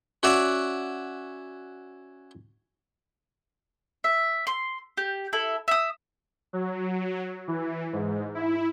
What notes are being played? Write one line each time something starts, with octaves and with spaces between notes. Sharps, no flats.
C#4 F#4 D5 E5 F#5
E5
C6
G4
E4 A4
E5 D#6
F#3
E3
G#2
E4